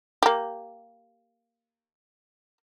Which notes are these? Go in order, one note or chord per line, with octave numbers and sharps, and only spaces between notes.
A#3 G4